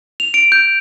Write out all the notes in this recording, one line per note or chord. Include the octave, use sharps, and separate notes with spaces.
F7
D7
G6